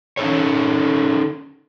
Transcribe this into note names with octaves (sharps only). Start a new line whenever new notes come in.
C#4 D#4 A4 C#5